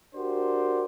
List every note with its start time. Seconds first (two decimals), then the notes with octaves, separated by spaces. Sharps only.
0.15 D4 F#4 G4 A#4 C5 D5